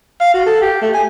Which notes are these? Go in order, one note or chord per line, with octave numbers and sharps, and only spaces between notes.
F5
F#4
A4
G4
A3
G#5